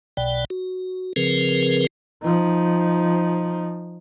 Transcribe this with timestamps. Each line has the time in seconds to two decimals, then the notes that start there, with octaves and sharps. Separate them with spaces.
0.17 B1 B2 D5 G5
0.50 F#4
1.16 C#3 F3 C4 G#4 A#4 B4
2.22 F3 D#4